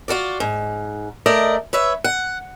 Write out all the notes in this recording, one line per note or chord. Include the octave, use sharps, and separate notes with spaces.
F4 F#4 A#4 D5
G#2
A3 A#4 D5 D#5
B4 C#5 E5
F#5